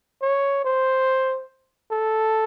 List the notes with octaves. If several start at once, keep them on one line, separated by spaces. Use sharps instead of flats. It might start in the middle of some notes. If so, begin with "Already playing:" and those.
C#5
C5
A4